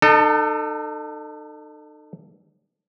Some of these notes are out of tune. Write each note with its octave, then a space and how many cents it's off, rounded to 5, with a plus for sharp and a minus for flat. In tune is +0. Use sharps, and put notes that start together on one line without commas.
D#4 -40 A4 +15